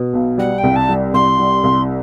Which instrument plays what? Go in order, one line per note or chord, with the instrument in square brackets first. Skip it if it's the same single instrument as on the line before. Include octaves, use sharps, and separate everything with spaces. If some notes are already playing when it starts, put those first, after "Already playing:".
Already playing: [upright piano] B2
B1
[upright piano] G3 [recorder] F#5
[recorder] G5
[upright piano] C2
[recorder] A5
[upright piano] G3
[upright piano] C2 [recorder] C6
[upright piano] G3
C2